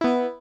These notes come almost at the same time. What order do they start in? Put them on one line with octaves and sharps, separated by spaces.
E4 B3 B4